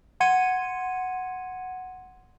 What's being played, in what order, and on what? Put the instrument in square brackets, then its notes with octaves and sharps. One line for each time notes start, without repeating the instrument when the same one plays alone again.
[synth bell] F#5 C6 G#6 C#7 D#7